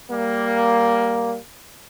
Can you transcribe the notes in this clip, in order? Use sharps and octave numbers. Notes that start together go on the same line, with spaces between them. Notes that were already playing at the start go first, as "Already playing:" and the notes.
G3 A#3